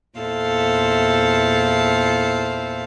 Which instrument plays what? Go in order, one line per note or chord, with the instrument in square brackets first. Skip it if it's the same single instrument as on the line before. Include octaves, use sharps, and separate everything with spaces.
[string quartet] E2 A#2 E4 A4 C5 F5